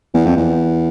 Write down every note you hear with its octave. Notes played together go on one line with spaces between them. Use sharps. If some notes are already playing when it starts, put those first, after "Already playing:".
E2
F2
E2